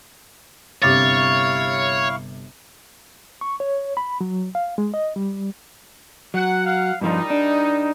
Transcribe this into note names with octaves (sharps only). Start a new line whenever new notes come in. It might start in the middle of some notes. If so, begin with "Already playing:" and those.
G1 C3 E4 C#5 F5 C#6 D6 A6
C#6
C#5
B5
F#3
F5
G#3
D#5
G3
F#3 F#5
F5 F#5
G2 A#2 F3 G3 D#4
D4